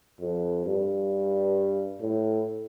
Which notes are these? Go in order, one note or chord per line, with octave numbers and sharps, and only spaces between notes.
F2
G2
A2